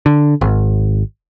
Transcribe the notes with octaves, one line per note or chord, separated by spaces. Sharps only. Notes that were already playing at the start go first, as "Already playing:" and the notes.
D3
G#1